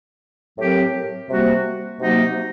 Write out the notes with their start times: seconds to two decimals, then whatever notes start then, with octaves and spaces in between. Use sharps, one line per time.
0.57 A2 F#3 C4 G4 A#4
1.29 C3 G3 A#3 F#4
1.99 C3 F#3 A#3 D#4 F#4